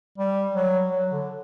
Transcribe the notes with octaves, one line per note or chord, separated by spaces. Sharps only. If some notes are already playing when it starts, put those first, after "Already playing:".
G3
F#3
F#3
D3